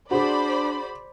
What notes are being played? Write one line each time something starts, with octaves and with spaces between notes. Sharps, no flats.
D4 F#4 G#4 C5 D5 B5